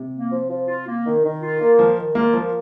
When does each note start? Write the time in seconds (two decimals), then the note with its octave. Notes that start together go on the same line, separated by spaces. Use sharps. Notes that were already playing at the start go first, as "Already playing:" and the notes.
Already playing: C3
0.13 A#3
0.30 F3
0.49 F3
0.67 F4
0.87 A#3
1.05 D#3
1.23 D#3
1.41 F4
1.59 A#3
1.79 D#3 F3
1.97 D#3
2.15 A#3 F4
2.33 F3 A#3